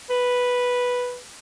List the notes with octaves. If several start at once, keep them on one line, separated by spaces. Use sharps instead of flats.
B4